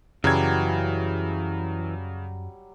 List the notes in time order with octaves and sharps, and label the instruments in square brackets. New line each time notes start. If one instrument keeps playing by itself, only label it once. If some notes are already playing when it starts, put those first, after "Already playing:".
[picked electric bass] F#2 [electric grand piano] C#3 G#6 [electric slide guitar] E3 [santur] F#3 G3 E6